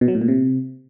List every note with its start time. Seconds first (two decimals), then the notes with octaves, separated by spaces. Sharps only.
0.01 B2
0.08 F#3
0.15 A2
0.21 A#2
0.28 C3